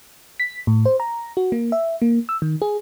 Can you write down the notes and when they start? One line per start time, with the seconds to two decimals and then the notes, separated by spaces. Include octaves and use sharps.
0.40 B6
0.67 A2
0.86 C5
1.00 A#5
1.37 F#4
1.52 A#3
1.72 E5
2.02 A#3
2.29 E6
2.42 D#3
2.62 G#4